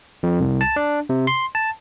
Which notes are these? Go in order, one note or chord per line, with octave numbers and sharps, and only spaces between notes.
F2
C2
A5
D4
C3
C6
A5